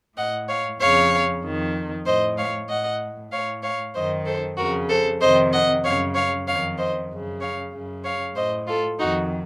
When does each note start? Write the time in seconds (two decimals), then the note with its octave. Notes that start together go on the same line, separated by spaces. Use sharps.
0.17 A2 D#5 F#5
0.48 C#5 F5
0.80 F2 C#3 C#5 F5
1.43 F2 D#3
2.06 A2 C5 D#5
2.37 C#5 F5
2.69 A2 D#5 F#5
3.32 A2 C#5 F5
3.63 C#5 F5
3.95 F#2 D#3 C5 D#5
4.26 A4 C5
4.58 F2 C#3 F#4 A#4
4.89 A4 C5
5.21 F2 C3 D#3 C5 D#5
5.52 D#5 F#5
5.84 F#2 C#3 C#5 F5
6.15 C#5 F5
6.47 F2 D#3 C#5 F5
6.78 C5 D#5
7.10 F#2 C#3
7.41 C#5 F5
7.73 F#2 C#3
8.04 C#5 F5
8.36 A2 C5 D#5
8.67 F4 A4
8.99 F2 D#3 D#4 F#4